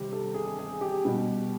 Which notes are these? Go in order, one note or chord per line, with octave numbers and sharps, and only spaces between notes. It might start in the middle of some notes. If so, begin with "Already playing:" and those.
Already playing: C3 D#3 G3 G4
A4
G#4
G#4
G4
B2 G3